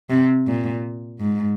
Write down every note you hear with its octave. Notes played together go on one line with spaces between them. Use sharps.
C3
A#2
G#2